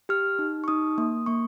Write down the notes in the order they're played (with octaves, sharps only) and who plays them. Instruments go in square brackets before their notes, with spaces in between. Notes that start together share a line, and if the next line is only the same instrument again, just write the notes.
[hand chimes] G4 F6
D#4
C#6
D#4 D#6
A#3 D#6
A#3 C#6